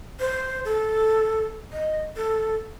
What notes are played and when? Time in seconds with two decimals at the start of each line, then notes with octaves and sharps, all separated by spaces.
0.20 C5
0.65 A4
1.73 D#5
2.16 A4